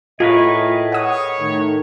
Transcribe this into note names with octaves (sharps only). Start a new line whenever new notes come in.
A2 F4 G#4 A#4 B4 D#5 C#6
C#5 F#5 D#6
A2 D#3